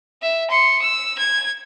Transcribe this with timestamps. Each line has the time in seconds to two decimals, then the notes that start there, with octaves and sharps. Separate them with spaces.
0.22 E5
0.50 C6 C#7
0.82 E6
1.18 G#6